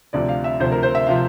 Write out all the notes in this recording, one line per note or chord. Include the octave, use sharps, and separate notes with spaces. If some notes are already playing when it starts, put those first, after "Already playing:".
D2 C3 F3 D5
F5
E5
D2 C3 F3 C5
A#4
C5
E5
C3 F3 F5